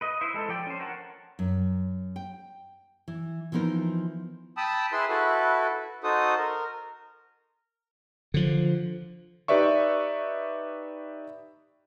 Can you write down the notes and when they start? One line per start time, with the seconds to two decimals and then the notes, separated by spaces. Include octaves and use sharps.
0.01 B4 D#5
0.21 E4 B4 C5 E5
0.34 G#3 A4 C5
0.49 F3 D5 G5
0.67 C#4 C5
0.80 A#4 C#5 F#5 A5
1.39 F#2
2.16 G5
3.08 E3
3.52 E3 F3 B3 D#4 A#4
4.57 G5 A5 B5 D#6 E6
4.92 E4 G#4 B4 C6 E6
5.09 E4 F#4 A4 B4
6.04 D#4 F#4 A4 C5 D#6
6.37 A#4
8.34 D3 F3
9.48 D#4 G4 B4 D5 E5 C#6